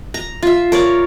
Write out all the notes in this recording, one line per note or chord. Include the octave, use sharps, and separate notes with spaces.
A#5
F4 E5
A#4 C#5 D5